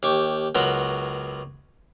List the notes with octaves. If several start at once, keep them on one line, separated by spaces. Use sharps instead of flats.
D#2 G4 C#6
C#2 F#3 B3 A#4 B5 C6